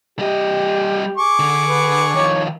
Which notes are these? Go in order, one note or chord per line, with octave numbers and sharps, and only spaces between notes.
G3 G4 D#5
G#4 C#6 D6
D3
B4
D#3 F3 C#5